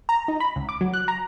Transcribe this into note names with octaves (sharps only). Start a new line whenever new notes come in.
A#5
D#4
B5
C#2
D6
F#3
F#6
A#5